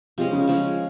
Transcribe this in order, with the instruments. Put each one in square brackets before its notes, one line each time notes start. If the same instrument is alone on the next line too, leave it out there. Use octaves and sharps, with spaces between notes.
[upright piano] C3 [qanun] F3 G#3 C#4
[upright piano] C#3
[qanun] F3 G#3 C#4